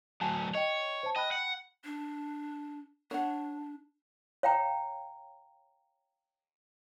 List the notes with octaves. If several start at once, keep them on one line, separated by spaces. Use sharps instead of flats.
D2 F#3 G#5 A5
C#5 D#5 G5
C5 A5
D#5 G5 B5 F#6
F#5
D4
D4 C#5 F#5
C#5 F5 G5 A#5